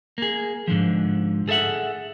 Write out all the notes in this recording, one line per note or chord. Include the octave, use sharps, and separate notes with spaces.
A#3 G#4
G#2 D3 D#3 F3
G#4 A4 C5 E5 F#5